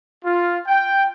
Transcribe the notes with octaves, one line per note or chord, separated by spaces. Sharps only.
F4
G5